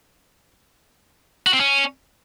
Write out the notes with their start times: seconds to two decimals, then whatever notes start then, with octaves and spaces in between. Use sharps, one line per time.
1.47 F#4
1.53 C4
1.60 C#4